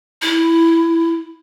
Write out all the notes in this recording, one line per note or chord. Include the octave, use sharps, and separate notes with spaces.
E4